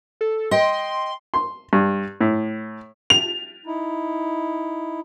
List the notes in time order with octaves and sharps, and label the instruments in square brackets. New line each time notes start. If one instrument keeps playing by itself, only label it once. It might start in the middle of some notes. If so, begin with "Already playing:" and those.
[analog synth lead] A4
[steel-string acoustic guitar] D#5 G5 [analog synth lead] C6
[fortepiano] C6
G2
A2
[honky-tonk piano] F7
[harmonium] D#4 E4